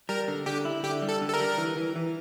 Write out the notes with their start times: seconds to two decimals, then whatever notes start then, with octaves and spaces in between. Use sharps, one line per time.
0.09 G3 A#4
0.28 D3
0.46 D3 G4
0.65 E4
0.83 D3 G4
1.02 G3
1.09 A4
1.22 D3
1.28 A4
1.34 A#4
1.40 G3
1.58 E3
1.77 E3
1.96 E3